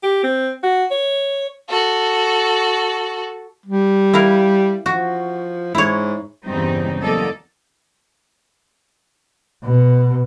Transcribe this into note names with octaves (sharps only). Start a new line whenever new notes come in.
G4
C4
F#4
C#5
F#4 A4
G3
E4 A#4 F5
F3 F#4
G#2 E4 C#5
E2 G2 C#3 G3 C4 D#4
E2 F#3 A#3 A4 D5 D#5
B2